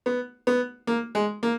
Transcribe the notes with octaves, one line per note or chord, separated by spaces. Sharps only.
B3
B3
A#3
G#3
A#3